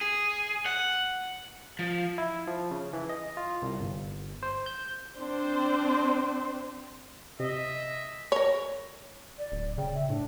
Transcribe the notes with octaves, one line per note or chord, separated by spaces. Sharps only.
G#4
F#5
F3
E4
F3
C#3
E3
D#5
F4
C2
G1
C5
G6
C4 D4 C5
C3 D#5 E5
A#4 C#5
D5
D1
C#3 G5
E5
A2 D4